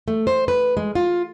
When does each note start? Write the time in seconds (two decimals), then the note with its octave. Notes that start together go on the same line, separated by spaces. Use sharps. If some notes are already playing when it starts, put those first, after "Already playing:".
0.08 A3
0.27 C5
0.48 B4
0.77 G#3
0.95 F4